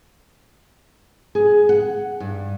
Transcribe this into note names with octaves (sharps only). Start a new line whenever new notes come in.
G#4
F#5
G2